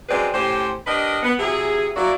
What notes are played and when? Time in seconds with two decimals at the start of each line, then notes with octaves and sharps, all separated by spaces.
0.09 F#2 G#3 C4 G#4 B4 D5
0.34 A2 C#4 G4 C5
0.87 D4 G4 A#4 B4 D#5
1.23 B3
1.40 C3 F#3 E4 G#4
1.96 F#3 A#3 E4 F#4 D5